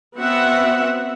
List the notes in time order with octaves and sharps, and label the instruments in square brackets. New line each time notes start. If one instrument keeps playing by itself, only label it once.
[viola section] B3 C4 F#4 E5 F#5